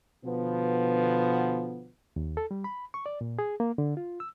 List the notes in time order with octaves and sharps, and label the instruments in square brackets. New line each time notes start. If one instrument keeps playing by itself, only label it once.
[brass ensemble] B2 D3 F3 B3
[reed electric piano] D#2
A4
G3
B5
C#6
D5
A#2
G#4
A#3
D3
F4
E6